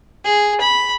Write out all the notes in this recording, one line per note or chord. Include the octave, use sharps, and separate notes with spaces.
G#4
B5